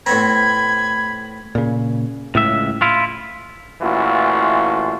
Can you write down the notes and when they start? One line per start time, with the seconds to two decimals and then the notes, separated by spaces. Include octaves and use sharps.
0.06 A2 B3 C4 B5 G#6
1.55 A#2 C#3
2.35 C#2 A2 E5
2.82 E4 F4
3.82 A1 A#2 E3 A3 F4 F#4